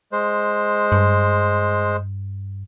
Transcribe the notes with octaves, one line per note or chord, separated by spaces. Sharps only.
G#3 C5
G2